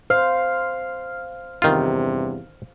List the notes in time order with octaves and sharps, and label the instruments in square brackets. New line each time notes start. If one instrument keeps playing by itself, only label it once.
[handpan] C5 [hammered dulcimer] F5
[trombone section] E2 G2 C3 [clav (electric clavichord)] D#3 F4